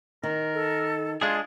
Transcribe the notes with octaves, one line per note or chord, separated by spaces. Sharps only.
D#3 A#4
A4
G#3 D4 F4 G#4 F5